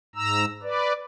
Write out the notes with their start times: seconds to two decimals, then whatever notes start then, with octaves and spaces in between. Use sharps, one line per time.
0.15 G#2 A#5 E6
0.63 B4 D5